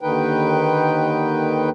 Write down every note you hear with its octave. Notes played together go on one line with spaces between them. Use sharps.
D#2 D3 D#3 D#4 B4 G5